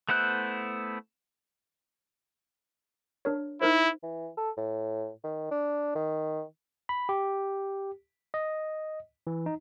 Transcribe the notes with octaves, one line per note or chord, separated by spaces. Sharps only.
A3 B3 E4 C5 F#6
D4 A#4 C#5
D#4 E4 A#4 C5
E3
A4
A2
D#3
D4
D#3
B5
G4
D#5
E3
D#4